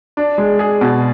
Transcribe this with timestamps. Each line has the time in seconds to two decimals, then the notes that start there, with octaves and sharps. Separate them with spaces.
0.17 D4
0.38 G#3
0.59 G#4
0.81 B2